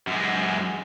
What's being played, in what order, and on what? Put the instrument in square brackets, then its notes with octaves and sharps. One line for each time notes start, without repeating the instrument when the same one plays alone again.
[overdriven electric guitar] F#2 G#3